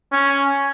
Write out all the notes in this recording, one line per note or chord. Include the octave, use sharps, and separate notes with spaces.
C#4